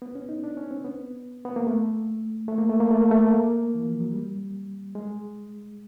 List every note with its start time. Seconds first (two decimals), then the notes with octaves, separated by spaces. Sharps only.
0.02 B3
0.15 C#4
0.29 D#4
0.44 D4
0.57 C#4
0.71 C4
0.84 B3
1.45 B3
1.56 A#3
1.67 A3
2.48 A3
2.58 A#3
2.69 A3
2.80 A#3
2.91 A3
3.01 A#3
3.11 A3
3.30 A#3
3.75 E3
3.88 F3
4.00 F#3
4.12 G3
4.95 G#3